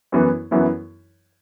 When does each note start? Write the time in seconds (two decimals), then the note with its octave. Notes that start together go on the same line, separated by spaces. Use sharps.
0.12 F#2 E3 B3 E4
0.51 F#2 E3 B3 E4